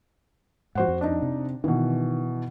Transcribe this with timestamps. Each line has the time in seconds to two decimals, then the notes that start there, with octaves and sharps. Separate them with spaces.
0.75 G#2 F3 F#4 C5 F#5
0.88 F2
1.01 D4 D#4
1.22 C3
1.64 B2 D#3 E3